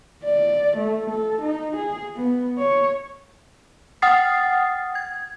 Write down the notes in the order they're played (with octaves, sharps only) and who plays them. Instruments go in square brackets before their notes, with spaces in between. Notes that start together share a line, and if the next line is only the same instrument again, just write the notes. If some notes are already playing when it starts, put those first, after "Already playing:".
[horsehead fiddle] D5
A3
A4
D#4
G#4
B3
C#5
[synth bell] F#5 G5 D#6 F6 A6 C7
G#6